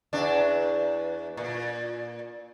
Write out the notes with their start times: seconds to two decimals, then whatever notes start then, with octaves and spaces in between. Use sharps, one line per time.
0.13 E2 D4
1.37 A#2